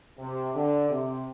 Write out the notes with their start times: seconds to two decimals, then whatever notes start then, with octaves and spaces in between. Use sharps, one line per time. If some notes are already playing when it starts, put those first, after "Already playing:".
0.18 C3
0.55 D3
0.90 C3